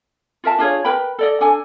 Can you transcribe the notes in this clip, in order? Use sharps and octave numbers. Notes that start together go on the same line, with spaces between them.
F4 A#4 E5 A5
D4 F4 G#4 C#5
A#4 B4 G5 B5
A4 D5 D#5
D4 A4 G#5